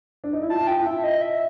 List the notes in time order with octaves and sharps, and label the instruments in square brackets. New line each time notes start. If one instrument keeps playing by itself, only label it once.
[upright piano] D4
D#4
E4
[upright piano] F4 [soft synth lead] A5
[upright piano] F4 [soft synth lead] G5
[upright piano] E4
[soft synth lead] E5
D#5
E5